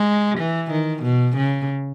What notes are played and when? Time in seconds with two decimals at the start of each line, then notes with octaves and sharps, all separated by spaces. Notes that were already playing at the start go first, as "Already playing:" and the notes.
Already playing: G#3
0.38 E3
0.71 D#3
1.03 B2
1.37 C#3